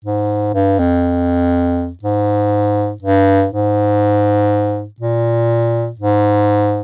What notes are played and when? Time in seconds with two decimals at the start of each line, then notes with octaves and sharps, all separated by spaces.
0.05 G#2
0.54 G2
0.79 F2
2.03 G#2
3.02 G2
3.52 G#2
5.00 A#2
5.99 G#2